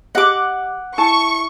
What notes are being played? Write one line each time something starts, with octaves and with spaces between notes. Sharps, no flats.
G4 D#5 F#5 D6
E4 A5 C#6